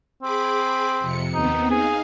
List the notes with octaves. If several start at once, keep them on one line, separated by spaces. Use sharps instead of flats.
C4 G#4 B5 D6
F2 C3 C#7
D#2 B3 C4 D#4
D#4 G#4 F5